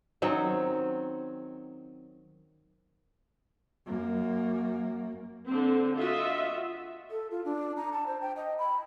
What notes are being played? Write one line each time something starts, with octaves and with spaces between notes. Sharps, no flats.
D#3 F#3 C4 C#4
F#2 A#3
D3 C4
F4 F#4 D#5 E5
A4
F4
D4
A#5
A5
C5
G5
D#5
B5